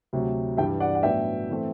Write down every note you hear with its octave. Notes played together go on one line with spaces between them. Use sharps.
D2 C3 F#3
G2 E3 G3 E5 G5
D5 F#5
F#5
A2 F#3 B3 D4 E5 G5
E3 A3 C4